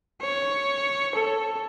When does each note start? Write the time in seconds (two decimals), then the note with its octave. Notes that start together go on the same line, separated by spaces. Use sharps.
0.21 C#5
1.15 A4